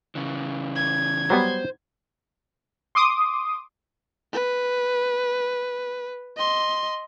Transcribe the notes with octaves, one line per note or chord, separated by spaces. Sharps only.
C#3 E3
G#6
F#3 G3 B3 C5
C6 D6 D#6
B4
D#5 C6